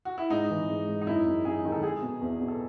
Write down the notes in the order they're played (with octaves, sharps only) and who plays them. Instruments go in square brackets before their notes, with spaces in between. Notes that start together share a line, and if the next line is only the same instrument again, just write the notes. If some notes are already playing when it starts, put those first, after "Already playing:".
[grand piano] F#4
E4
[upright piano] G#2 [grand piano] D#4
[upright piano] E3
G#2
G#2
[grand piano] D#4
[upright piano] F#2 [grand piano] E4
[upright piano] F#2
[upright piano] F#2 [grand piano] G#4
[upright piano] D#3
[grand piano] A4
[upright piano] G#3 [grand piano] G#4
[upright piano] B2
E2
B2
[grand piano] A4